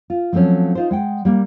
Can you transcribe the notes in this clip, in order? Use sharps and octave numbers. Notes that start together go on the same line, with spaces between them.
F4
F3 F#3 A3 C4 C#4
D#4 F4 C5
G#3 F#5 G5
G3 A#3